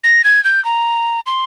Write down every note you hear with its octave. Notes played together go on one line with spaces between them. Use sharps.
A#6
G#6
G6
A#5
C6